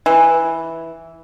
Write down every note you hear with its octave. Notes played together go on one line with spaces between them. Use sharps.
E3